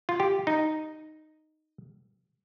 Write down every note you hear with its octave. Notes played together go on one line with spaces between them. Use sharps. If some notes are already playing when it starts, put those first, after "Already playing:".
F4
G4
D#4